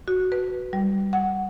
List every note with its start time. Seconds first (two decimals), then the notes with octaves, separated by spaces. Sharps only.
0.08 F#4
0.32 B4
0.73 G3
1.13 F#5